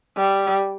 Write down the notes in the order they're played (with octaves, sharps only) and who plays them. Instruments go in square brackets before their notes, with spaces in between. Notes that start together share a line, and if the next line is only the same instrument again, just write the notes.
[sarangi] G3